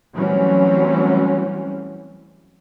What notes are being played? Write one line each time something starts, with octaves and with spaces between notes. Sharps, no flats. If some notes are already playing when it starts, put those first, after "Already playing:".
E3 F#3 G3 A3 C4 C#4